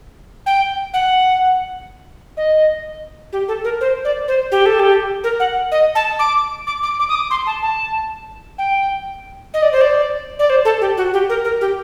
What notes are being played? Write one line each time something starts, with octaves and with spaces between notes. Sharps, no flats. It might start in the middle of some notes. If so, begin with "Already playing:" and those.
G5
F#5
D#5
G4
A4
A#4
C5
D5
C5
G4
A4
G4
A#4
F#5
D#5
A5
D6
D6
D6
D6
D#6
D6
C6
A5
A5
G5
D#5
D5
C5
D5
D5
C5
A4
G4
F#4
G4
A#4
A#4
G4